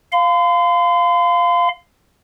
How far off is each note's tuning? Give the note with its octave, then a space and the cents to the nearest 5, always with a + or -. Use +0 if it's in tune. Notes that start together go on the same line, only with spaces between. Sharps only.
F5 +0 C6 -45